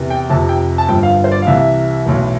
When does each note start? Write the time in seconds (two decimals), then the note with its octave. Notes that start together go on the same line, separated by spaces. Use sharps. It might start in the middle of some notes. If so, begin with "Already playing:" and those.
Already playing: E2 C3 E3
0.10 G5
0.30 F1 F2 C3 A5
0.49 G5
0.78 A5
0.88 G1 G2 F3 G5
1.03 F5
1.24 C5
1.32 D5
1.42 F5
1.47 C2 C3 E3 E5
2.05 B1 A2 E3